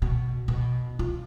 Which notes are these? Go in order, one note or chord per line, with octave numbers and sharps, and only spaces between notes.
B2
B2
F4